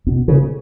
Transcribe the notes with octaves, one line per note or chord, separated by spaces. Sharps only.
B2
C#3